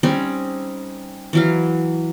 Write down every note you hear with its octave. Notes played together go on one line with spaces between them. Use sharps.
G3 C4 C#4 D#4
E3 F#3 F5